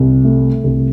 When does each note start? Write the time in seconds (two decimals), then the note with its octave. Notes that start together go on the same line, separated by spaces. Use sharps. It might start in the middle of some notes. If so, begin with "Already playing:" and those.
Already playing: C2
0.24 A3
0.64 C2